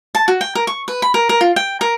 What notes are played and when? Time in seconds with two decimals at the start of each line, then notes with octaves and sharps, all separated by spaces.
0.15 A5
0.28 F#4
0.41 G5
0.55 A#4
0.67 C#6
0.88 B4
1.02 B5
1.14 A#4
1.29 A#4
1.41 F4
1.56 G5
1.81 A#4